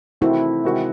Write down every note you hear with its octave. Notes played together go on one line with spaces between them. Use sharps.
C3 D#3 A3 C4 E4 F#4
C3 D#3 G#3 C4 F#4